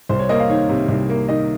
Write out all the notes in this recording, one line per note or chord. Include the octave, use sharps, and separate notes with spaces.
C2 C5
C#5
A#3 D#5
F5
D#3 C#5
C3
C2
A#3
D#3 D#5